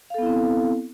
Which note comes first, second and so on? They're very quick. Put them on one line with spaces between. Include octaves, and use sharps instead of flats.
F5 A4 B3 E4 C4